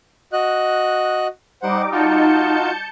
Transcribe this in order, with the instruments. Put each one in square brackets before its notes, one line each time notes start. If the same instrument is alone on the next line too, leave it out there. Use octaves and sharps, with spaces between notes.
[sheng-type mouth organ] F#4 D#5 F#6
[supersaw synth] G3 D#4 D6 [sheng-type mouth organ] C5 F#5
[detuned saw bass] D#4 [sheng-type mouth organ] F4 F#4 [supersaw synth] A5 G6 C#7